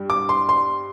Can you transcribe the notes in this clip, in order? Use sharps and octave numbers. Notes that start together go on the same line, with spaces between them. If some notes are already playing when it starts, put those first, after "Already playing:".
Already playing: G2 G3
D6
C6
C6